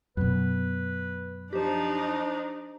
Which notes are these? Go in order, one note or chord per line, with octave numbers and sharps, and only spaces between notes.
F#2 B2 B4
F3 D4 D#4 G4 C5